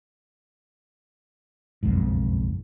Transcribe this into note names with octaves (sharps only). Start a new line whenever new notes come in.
F#1 B1 F2 G#2